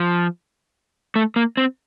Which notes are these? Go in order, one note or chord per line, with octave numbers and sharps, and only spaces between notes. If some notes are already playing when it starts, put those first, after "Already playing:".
Already playing: F3
A3
A#3
C4